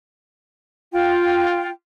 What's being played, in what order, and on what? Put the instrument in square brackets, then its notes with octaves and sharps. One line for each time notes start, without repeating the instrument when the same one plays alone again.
[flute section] F4 G5